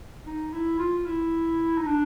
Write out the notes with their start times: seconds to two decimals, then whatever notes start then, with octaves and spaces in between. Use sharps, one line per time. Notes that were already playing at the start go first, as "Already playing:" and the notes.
0.26 D#4
0.53 E4
0.79 F4
1.06 E4
1.78 D#4
1.86 D4